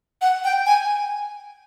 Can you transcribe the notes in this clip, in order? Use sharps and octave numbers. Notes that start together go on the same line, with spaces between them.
F#5
G5
G#5